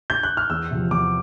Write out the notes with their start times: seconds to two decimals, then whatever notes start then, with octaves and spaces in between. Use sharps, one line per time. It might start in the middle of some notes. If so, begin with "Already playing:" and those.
0.10 G6
0.23 F#6
0.37 F6
0.50 E2 E6
0.71 C3 F3
0.91 E2 D6